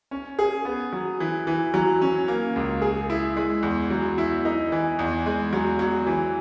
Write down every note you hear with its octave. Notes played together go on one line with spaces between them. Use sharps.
C#4
G#4
B3
F#3
E3
E3
F#3
C#4
A#3
C#2
G#4
E4
G#3
E2
F#3
E4
D#4
E3
E2
G#3
F#3
F#3
E3